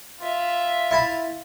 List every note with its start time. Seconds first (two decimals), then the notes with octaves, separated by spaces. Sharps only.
0.20 F4 E5
0.91 E4 A5 B5